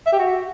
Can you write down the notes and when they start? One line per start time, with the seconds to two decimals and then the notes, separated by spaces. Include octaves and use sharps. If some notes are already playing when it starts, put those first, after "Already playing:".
0.06 E5
0.12 G4
0.19 F#4